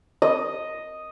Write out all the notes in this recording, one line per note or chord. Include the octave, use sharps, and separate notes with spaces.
D#5